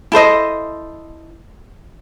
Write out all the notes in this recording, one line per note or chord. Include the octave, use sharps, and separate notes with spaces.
E4 A4 C5 D#5